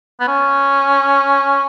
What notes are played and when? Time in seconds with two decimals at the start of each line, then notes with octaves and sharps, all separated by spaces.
0.20 B3
0.28 C#4